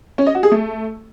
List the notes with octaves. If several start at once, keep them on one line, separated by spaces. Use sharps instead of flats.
C#4
D#5
F#4
G#4
A3